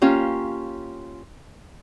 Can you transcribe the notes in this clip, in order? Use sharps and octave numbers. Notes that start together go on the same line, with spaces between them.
A#3 C#4 F4 G4